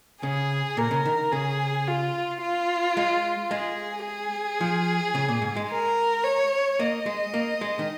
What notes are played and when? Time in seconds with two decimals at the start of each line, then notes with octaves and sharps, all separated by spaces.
0.23 C#3 G#4
0.77 A#2 A#4
0.91 C#3
1.06 D#3
1.32 C#3 G#4
1.87 F4
2.42 F4
2.97 G#3
3.51 G#3 G#4
4.06 G#4
4.61 F3
5.15 C#3
5.28 A#2
5.42 G#2
5.56 G#3
5.70 A#4
6.24 C#5
6.79 A#3 D#5
7.06 G#3
7.34 A#3
7.61 G#3
7.79 D#3